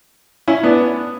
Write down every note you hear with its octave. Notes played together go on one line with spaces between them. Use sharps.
C#4 E4
B3 D4